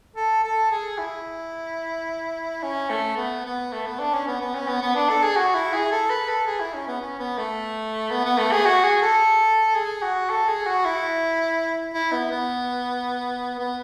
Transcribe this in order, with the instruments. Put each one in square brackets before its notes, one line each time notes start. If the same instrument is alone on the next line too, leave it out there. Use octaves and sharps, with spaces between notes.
[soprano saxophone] A4
A4
G#4
E4
C#4
A3
B3
B3
A3
B3
D4
C#4
B3
B3
C#4
B3
B3
D4
A4
G#4
F#4
E4
G#4
A4
B4
A4
G#4
E4
C#4
B3
C#4
B3
A3
B3
B3
A3
G#4
F#4
G#4
A4
G#4
F#4
A4
G#4
F#4
E4
E4
B3
B3
B3